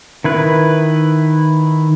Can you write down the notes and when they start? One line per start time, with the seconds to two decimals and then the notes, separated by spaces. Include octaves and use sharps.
0.24 D#3 E4 B4